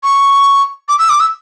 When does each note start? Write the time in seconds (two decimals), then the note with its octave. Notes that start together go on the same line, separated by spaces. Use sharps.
0.03 C#6
0.89 D6
0.99 E6
1.10 D6
1.20 E6